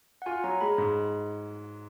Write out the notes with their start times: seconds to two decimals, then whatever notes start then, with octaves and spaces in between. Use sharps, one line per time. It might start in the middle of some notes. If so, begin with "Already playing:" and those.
0.22 F#5
0.26 F4 G#5
0.44 F#3 A#5
0.61 G#3 B5
0.78 G#2